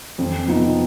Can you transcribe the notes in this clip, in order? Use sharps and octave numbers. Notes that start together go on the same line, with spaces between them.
F2
F3 B3 D#4